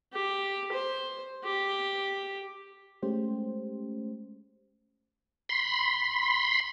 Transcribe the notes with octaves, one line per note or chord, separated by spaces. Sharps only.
G4
C5
G4
G#3 A3 C#4 G4 C5
B5 C6